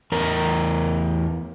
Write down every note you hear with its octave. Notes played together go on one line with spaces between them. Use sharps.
E2 A#4